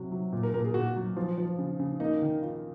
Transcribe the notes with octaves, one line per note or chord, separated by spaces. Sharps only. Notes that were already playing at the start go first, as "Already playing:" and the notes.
Already playing: C3 F#3
F#3
A#2
A#4
A#2 A#4
G#4
A#2 F#4
F#3
F3 F4
F3
C#3
C#3
A#3 D#4
D#3
F4